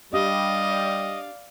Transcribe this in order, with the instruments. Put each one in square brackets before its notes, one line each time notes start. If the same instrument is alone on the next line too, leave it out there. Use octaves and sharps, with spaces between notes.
[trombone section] G3 [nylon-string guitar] D4 G4 [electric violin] D5 F5 [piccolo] D#5